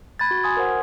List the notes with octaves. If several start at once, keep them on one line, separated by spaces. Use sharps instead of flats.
B5 F#6 G#6 A6
F#4
G#5 C6 D#6 G#6
A#4 C5 F#5